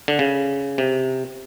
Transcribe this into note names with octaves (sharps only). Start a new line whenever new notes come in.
D3
C#3
C3